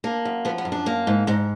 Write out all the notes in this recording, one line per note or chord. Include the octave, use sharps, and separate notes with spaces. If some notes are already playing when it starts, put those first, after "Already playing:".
A#3 D4
F#2
F3 B3
B3
F#2
D4
A#3
G#2
G#2 D#4